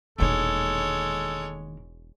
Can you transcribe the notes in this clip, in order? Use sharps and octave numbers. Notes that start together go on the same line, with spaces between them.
E1 A#2 D#3 G#3 A4 C#5